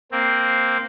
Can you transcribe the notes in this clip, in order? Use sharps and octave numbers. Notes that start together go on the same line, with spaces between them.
A#3 C4